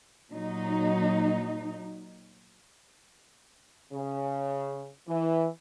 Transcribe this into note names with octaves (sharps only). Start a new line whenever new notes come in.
A#2 F#3 D#4
C#3
E3